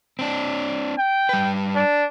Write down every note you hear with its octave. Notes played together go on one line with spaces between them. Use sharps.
C4 D4
G5
G3 B4
D4